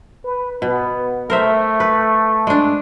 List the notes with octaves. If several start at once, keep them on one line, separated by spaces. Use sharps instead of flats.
B4
B2 B3
A3 A#4 C5 E5
B4
G#3 D4